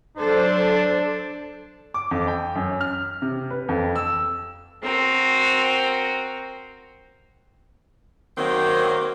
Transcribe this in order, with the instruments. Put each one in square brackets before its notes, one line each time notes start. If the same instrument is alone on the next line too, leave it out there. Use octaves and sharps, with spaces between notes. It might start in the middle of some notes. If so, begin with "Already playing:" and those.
[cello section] F#3 A4 C5 [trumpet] D4
[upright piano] D6
F2
G5
F#2
F6
C3
B4
F2
E6
[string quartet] C4 F#4 A#4
[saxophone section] D#3 F#3 A#3 C4